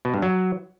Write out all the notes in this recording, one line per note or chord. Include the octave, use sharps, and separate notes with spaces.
B2
G2
F#3